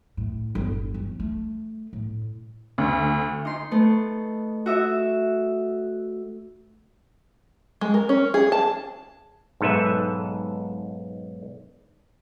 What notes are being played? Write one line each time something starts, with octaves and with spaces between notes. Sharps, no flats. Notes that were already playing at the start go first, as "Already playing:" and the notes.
A2
G1
F3
A3
A2
D2
D#4 C6
A3 B3
F#4 E5 D#6
G#3
A#4
C#4
G#4
A5
B1 G#2 A4 B4 E5